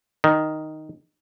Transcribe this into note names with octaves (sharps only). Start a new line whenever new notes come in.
D#3